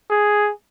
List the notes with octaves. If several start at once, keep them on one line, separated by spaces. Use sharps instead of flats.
G#4